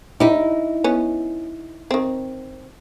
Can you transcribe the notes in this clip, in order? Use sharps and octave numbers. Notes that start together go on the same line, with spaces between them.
D#4 E4 G4
B3 C#4
D#3 C4